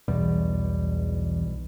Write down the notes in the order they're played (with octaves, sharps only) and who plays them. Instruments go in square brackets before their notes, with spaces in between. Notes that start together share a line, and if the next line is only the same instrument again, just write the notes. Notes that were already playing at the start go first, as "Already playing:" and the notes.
[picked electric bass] B1 B2 G3 [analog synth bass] E2